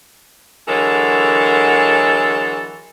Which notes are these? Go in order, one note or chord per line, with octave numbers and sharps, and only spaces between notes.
D3 E3 F#3 G#3 A4 A#4